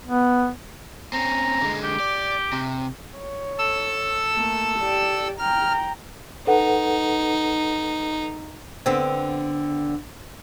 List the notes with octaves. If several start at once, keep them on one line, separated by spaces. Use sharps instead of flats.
B3
C4 C#4 A#5
D3 G#3
G4
D5
C3
C#5
A4 E6
A3 A#3
G4 D5
G5 A#5 F6
D#4 A4 B4 F#5
D3 B3 C4